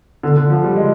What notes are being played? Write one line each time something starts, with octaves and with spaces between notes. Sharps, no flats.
D3
D3
F3
G3
G#3